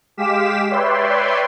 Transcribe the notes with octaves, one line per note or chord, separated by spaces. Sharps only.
G#3 G4 F5 D6 B6 E7
B4 C#5 D5 E5 G5 C6